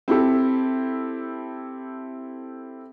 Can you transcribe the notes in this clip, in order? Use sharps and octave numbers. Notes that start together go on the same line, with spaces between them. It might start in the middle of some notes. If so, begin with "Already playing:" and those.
C4 E4 G4 A4